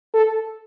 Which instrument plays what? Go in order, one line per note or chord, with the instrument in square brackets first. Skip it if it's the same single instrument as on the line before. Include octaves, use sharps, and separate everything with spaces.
[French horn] A4